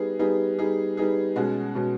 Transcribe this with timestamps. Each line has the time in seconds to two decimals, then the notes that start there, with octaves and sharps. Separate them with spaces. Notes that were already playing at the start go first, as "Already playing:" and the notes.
Already playing: G3 B3 D#4 G#4
0.19 G3 B3 D#4 G#4
0.59 G3 B3 D#4 G#4
0.97 G3 B3 D#4 G#4
1.36 B2 G#3 C#4 F#4
1.75 B2 G#3 C#4 F#4